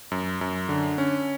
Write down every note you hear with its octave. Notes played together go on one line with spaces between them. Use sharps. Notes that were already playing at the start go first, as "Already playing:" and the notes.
F#2
F#2
D3
C#4